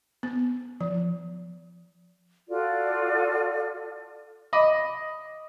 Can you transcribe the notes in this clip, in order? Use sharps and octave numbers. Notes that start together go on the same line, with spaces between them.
B3
F3
F4 F#4 A4 D5
D#5 B5 D6